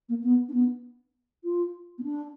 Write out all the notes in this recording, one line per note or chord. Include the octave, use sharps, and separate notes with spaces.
A#3
B3
D4
B3
F4
B3
D4